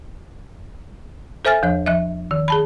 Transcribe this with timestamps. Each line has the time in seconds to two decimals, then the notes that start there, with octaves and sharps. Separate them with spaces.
1.45 A4 C5 E5 G#5 F6 A6
1.63 E2 F3 C#5
1.86 F3 D#5 E5
2.31 D#3
2.48 G#4 A5 B5